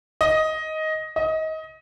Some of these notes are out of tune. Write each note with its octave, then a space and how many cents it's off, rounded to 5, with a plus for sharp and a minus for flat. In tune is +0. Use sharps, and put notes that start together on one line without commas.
D#5 +10
D#5 +25